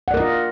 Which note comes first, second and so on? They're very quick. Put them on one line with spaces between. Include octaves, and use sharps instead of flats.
F#5 D5 A#4 D#5 F4